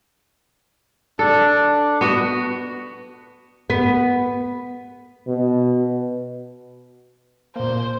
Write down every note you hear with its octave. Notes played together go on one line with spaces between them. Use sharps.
D4 A4
B3 F#4
B3
B2
A#2 A#3 C5